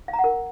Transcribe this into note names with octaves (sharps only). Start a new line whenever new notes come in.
F5
A#5
F#5
A#4